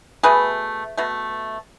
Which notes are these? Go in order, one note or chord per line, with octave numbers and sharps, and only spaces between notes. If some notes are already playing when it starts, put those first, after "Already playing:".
B2 A3 G#4 B4
B2 A3